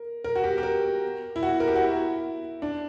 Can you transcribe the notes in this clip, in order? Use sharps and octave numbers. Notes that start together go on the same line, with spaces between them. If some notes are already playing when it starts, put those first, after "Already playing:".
Already playing: A#4
A#4
F#4
G4
G4
A#4
E4
F#4
A#4
G4
F#4
E4
D4